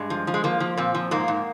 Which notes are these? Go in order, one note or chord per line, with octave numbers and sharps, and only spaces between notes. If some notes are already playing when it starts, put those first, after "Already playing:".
Already playing: G2 G#3
F3
F3
G#3
F3 A#3
F3
A#2 C4
F3
G#2 A#3
G#2